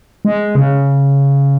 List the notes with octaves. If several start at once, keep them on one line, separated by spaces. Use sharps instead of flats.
G#3
C#3